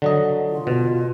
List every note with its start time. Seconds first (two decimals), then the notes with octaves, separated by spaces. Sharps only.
0.02 D3 F#3 D#5
0.50 F4
0.67 B2